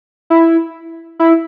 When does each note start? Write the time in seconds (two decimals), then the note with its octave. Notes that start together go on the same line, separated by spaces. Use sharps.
0.30 E4
1.20 E4